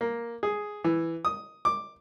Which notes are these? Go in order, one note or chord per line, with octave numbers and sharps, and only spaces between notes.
A#3
G#4
E3
D#6
D6